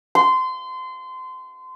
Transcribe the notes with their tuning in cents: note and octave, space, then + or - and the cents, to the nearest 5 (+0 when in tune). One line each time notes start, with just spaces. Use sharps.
C6 -25